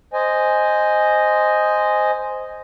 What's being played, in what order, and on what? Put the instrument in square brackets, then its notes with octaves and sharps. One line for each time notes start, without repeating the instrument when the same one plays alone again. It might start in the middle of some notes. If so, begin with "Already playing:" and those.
[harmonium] C5 D#5 G#5